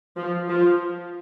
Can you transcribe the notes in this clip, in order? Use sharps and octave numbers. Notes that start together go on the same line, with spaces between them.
F3
F3